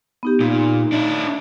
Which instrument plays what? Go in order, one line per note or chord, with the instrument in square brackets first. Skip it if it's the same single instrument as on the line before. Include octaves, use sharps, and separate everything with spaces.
[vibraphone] B3 D#4 G4
[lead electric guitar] A#2 [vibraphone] D#4
[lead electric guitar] D4 E4